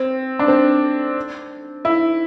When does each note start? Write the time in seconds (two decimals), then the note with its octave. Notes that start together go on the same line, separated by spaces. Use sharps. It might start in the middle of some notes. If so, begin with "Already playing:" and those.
Already playing: C4
0.39 D4
0.48 C4
1.85 E4